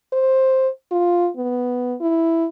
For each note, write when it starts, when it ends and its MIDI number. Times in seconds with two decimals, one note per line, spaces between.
0.13 0.68 72
0.91 1.29 65
1.37 1.94 59
2.01 2.46 64